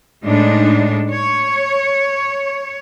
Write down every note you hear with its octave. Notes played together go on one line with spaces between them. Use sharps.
A2 G#3 D4 D#4
C#5